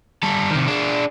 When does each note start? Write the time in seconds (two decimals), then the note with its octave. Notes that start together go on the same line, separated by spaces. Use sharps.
0.23 G3 A4
0.51 C3 D#3
0.68 D4 G#4